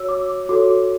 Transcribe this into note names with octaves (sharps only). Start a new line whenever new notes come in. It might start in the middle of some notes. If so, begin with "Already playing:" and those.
Already playing: F#4 C#5 E6
D6
F#4 A4 C#5 D6